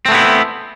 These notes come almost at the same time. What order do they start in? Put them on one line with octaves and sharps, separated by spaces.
C4 A3 B3 E4